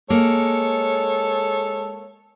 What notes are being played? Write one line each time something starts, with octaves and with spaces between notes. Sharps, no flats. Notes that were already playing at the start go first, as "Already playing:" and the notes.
G#3 A#3 A4 C#5